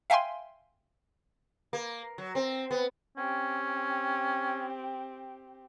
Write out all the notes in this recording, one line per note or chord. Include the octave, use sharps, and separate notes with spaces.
E5 F5 G5 G#5 C6
A#3
F#3
C4
B3
C4 C#4 G4